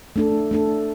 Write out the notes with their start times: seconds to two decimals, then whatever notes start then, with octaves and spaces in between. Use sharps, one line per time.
0.16 A3 D4 A4
0.51 A3 D4 A4